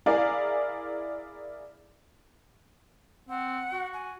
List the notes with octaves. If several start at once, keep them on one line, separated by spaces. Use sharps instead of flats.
E4 G#4 A#4 D5 F5 G#5
C4 F#5
F#4
G#5